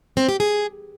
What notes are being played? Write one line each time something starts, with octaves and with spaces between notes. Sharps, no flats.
C4
G4
G#4